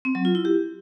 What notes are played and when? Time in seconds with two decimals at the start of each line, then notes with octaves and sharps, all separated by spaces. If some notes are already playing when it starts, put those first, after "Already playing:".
0.05 C4
0.15 F#3
0.25 F4
0.35 E4
0.45 G4